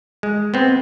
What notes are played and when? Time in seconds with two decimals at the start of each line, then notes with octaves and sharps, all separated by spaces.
0.23 G#3
0.54 B3 C4